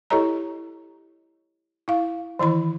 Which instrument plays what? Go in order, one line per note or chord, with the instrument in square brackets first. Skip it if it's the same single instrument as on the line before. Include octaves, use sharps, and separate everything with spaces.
[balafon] E4 G4 A4 C#5 D#5 A#5
E4 F5
D#3 E3 E4 B5